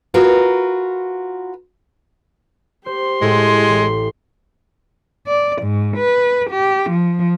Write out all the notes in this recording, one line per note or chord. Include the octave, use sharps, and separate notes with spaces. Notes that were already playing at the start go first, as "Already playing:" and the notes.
F4 F#4 A#4 B4
G4 C5 C6
A2 G#3 A4 G5
A1
D5
G#2
B4
G4
F3